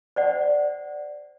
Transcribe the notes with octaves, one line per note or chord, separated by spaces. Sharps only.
C5 D5 F#5